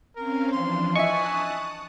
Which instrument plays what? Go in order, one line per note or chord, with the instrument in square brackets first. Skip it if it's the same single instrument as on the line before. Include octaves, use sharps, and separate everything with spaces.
[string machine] C4 C#4 F5 [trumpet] A#4
[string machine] E3 F3 D4 [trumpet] C6
[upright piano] D#5 E5 [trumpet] G#5 [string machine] A5 D#6 F#6 [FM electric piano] C#6